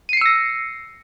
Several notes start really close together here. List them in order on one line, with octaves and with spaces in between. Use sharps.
D#7 C7 C#7 E6 A#6